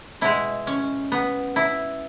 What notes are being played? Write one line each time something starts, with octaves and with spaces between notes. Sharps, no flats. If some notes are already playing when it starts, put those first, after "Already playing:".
B2 G#3 E4
C#4
B3
E4